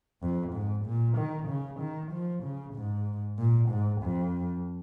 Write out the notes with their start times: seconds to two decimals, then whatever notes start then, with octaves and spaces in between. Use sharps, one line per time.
0.22 F2
0.54 G#2
0.86 A#2
1.18 D#3
1.49 C#3
1.81 D#3
2.12 F3
2.44 C#3
2.75 G#2
3.38 A#2
3.70 G#2
4.02 F2